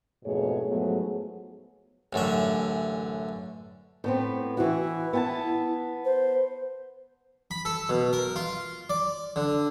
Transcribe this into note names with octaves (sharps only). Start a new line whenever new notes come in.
F2 G#2 B2 A3 G#4 C#5
G#2 F3 F#3 A3 B3 G#4
A1 F#2 D3 E5
A2 B3 C4
E3 E4 F#4
B3 G#5 A5
C5
B5
A4
B2
A#4
F4
D5
D3